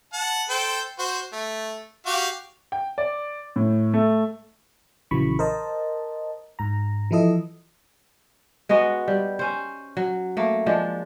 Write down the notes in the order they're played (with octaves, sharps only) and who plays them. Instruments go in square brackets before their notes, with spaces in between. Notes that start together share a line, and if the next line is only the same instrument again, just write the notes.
[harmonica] F#5 A5
A4 C5 G5
F#4 C5
A3
F#4 G4 F5
[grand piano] G5
D5
A2
A3
[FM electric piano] A#1 C#3 E3 F#3 B5 C#6
A#4 C5 D#5 A5
G#2 A#5
E3 F3 E4 A4 D#5
[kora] G#3 B3 F#4 D#5
G3
C#4 C5
F#3
A3 A#3
F3 G#3 D4